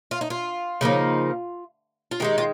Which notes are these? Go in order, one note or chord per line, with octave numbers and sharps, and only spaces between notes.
F4
D#4
F4
C#3 F3 A#3 D#4
F4
D#3 G#3 D#4 G4
F4